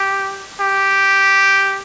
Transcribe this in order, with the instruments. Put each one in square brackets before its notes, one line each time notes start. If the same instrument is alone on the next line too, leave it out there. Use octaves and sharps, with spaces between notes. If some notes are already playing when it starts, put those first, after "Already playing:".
Already playing: [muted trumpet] G4
G4